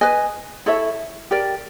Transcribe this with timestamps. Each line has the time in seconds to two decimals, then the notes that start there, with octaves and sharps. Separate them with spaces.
0.01 B4 D#5 G#5
0.66 E4 A4 C#5 E5
1.31 G4 A#4 D5